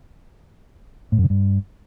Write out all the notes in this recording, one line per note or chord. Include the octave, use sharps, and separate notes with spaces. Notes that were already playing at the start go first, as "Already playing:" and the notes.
A2
F#2
C#3
G2